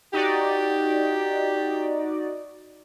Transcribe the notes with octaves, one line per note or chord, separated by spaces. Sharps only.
D#4 F#4 G4 D5